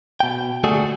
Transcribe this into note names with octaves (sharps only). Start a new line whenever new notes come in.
B2 G5
D2 A3 D4 F#4 G#4